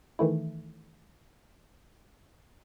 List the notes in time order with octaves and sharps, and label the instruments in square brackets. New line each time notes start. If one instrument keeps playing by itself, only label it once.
[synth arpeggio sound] D#3 E3 A3 E4